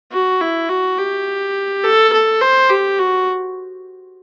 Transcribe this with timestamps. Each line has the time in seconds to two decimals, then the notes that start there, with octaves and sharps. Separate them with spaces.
0.12 F#4
0.41 E4
0.69 F#4
0.98 G4
1.84 A4
2.13 A4
2.42 C5
2.70 G4
2.99 F#4